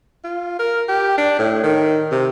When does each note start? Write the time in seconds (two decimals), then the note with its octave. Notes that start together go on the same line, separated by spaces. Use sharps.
0.24 F4
0.59 A#4
0.89 G4
1.18 D4
1.39 A2
1.64 D#3
2.12 C3